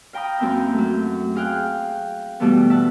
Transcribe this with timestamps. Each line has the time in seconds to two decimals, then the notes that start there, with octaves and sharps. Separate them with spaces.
0.13 F5 G5 A#5 B5 D#6
0.38 F#2 A#3 C4 E5 G6
0.74 F#3 A3
1.35 G#4 F5 G5 F#6
2.40 B2 E3 G3 A3 B3
2.70 E5 F#5 A5